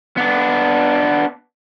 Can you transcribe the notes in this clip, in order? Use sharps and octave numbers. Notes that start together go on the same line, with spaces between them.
B3 D4